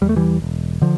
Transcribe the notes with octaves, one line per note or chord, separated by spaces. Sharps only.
E2 G3
A3
E3 G3
E1
D3 F3